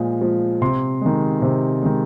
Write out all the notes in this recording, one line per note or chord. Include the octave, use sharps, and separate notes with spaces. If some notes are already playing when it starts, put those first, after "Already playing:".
Already playing: A#2 F3 G#3
F3 G#3
C3 C6
D#3 G#3
C3
D#3 G#3